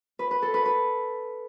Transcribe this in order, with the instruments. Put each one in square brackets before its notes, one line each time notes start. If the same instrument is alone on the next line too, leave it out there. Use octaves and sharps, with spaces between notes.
[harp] B4
B4
A4
B4
B4